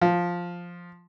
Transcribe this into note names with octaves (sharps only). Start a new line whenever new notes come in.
F3